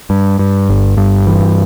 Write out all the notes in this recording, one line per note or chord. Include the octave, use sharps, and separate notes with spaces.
G2
G2
G1
G2
E3